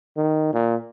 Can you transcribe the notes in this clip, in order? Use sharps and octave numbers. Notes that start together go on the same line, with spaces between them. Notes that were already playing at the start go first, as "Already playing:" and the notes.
D#3
A#2